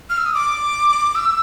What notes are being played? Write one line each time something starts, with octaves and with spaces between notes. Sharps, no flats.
F6
E6
D#6
D6
E6